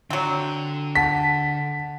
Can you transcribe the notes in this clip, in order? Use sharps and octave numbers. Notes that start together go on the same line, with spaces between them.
D3 F#3 C4
F#5 A5 A6 B6